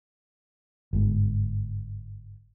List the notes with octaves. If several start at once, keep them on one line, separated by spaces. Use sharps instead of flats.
G1 G#2